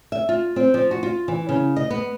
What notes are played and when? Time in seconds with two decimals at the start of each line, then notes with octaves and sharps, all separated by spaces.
0.12 E5
0.29 F4
0.56 C4
0.74 F3
0.91 F#4
1.03 F4
1.28 E3
1.49 C#3
1.76 D#5
1.91 B3